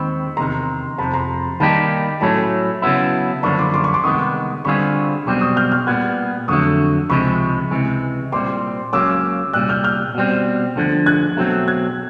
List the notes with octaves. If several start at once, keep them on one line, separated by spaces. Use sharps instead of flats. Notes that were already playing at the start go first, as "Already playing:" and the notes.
Already playing: D#2 D#3 G#3 C4 B5 C#6
E2 C3 D#3 A#5 C6
F2 C3 F3 A5 B5
A#5 C6
D#3 G3 A#3 D#4 G4 A5 B5
A2 F#3 A3 C#4 A5 B5
C#3 F#3 B3 E4
F#2 D3 F3 A#3 D4 B5 C#6
C6 D6
C6 D6
B5 C#6
C6 D6
C2 C3 D#3 G#3 B3 C#6 D#6
D3 G3 C4 F4 G#4 B5 C#6
B1 B2 G3 C4 C6 D6
C#6 D#6
F6 G6
F6 G6
A#2 G3 B3 F#6 G#6
F2 D3 F#3 A3 C#6 D#6
C#2 C3 F3 G#3 B5 C#6
C#2 C3 E3 G#3
A#2 G3 C4 C6 D6
C#2 C#3 F#3 A#3 C#4 D6 E6
C2 A#2 G3 E6 F#6
F6 G6
F6 G6
B2 G3 C4
D2 D3 F3
F#6 G#6
B2 F#3 A3 C4
F#6 G#6